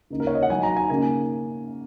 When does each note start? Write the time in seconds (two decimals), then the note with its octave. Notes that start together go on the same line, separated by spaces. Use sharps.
0.10 C#3 A#3 D#4
0.20 A#4
0.27 C#5
0.35 D#5
0.42 F#5
0.50 F#3 D#4 G#5
0.63 A#5
0.77 G#5
0.90 C#3 A#3 D#4 G#5